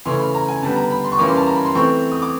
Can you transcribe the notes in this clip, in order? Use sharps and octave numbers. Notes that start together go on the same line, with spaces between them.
C#3 E3 A3 C#4 C6
B5
A#5
G#5
D3 G3 B3 A5
A#5
B5
C6
C#6
E3 G3 A#3 C#4 D6
C6
A5
A#5
B5
C6
E3 A3 C4 C#6
D#6
D6